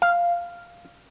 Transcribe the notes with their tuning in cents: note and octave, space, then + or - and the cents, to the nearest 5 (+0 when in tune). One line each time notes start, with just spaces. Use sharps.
F5 -5